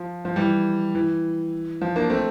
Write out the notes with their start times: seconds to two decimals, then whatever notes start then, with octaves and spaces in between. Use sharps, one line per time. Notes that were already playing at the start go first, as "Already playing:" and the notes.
Already playing: F3
0.25 F3
0.36 E3 G3
0.95 E3
1.81 F3
1.96 A#3 D4
2.10 A3 C4